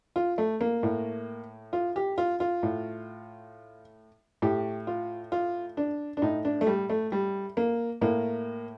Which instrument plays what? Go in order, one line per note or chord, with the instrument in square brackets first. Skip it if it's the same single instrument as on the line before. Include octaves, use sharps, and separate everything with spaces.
[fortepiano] F4
A3
A#3
A2
F4
G4
F4
F4
A2
A2 G4
F4
F4
D4
D4
A2 D#4
D4
A3
G3
A3
G3
A#3
A2 A#3